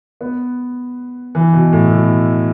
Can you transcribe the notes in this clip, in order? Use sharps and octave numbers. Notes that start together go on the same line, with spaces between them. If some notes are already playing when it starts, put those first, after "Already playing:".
B3
E3
B2
A2
B2